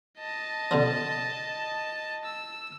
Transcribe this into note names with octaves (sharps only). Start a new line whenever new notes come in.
D#5 A5
B2 D3 F3
E6